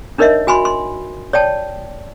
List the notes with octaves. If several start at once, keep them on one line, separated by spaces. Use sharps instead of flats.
D4 D#4 A#4 C#5 D#5 E5
F#4 G#5 B5 C6
C6
C#5 D5 G5 A5